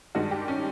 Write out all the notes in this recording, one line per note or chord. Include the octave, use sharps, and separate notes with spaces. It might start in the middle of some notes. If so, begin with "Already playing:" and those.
G2 D#3 G#3 F#4
G4
C#4